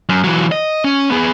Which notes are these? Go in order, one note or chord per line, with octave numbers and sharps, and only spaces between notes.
F#2
E3 F#3
D#5
C#4
B3 G#4